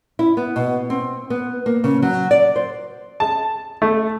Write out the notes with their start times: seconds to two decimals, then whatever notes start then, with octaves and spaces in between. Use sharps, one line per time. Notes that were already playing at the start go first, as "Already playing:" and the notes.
0.19 E4
0.37 B3
0.56 B2
0.90 C4
1.30 B3
1.66 A#3
1.84 C#3
2.02 F#3
2.31 D5
2.56 C5
3.20 A5
3.82 A3